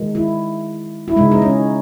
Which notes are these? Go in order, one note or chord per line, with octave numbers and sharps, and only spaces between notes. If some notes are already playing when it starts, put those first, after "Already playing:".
Already playing: D#3 G#3
E4
E4
C#3 G#3 D#4
D#4
C#4